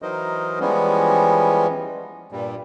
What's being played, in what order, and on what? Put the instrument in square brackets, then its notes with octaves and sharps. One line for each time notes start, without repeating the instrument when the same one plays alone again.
[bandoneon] E3 F#3 D#4 A#4 C5 D#5
E3 F3 G3 G#3 B3 C#4
G2 A#2 G3